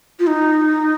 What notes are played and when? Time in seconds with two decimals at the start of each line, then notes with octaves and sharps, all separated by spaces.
0.19 F4
0.27 D#4